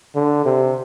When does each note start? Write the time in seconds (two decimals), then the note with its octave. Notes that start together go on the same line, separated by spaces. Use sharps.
0.15 D3
0.45 C3